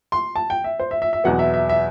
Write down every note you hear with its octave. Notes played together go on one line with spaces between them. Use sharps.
C6
A5
G5
E5
C5
E5
E5
E5
E2 B2 F#3 B3 F#5
E5
E5
E5